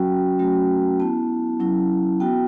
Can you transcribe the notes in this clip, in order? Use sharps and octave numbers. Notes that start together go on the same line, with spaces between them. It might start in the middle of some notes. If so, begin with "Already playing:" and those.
Already playing: F#3 C#4 F#4 G5
F#3 A3 C#4 F#4
B3 E4 A5
F#3 C#4 E4
B3 F#4 G5